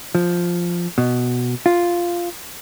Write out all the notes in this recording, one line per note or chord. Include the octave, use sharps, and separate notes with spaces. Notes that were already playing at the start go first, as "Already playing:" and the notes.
F3
B2
F4